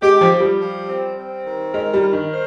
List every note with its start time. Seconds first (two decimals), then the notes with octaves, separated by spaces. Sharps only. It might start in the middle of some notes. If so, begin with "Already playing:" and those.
0.02 G#3 G4
0.21 F3
0.31 G4
0.40 G3
0.60 F3
0.88 C4
1.16 C4
1.45 D#3
1.74 G#3 A#4
1.93 G3
2.03 A#4
2.13 D#3
2.32 C5